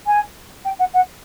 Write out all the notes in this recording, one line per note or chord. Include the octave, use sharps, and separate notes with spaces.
G#5
G5
F#5
F#5